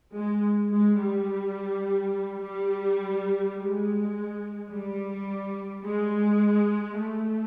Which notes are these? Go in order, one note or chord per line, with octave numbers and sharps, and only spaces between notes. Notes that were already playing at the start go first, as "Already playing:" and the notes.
G#3
G#3
G3
G3
G#3
G3
G#3
A3